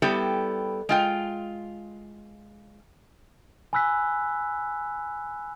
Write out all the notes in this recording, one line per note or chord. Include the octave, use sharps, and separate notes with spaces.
G3 B3 E4 G4 A4
G#3 F4 G5
G#5 B5 E6 F#6 B6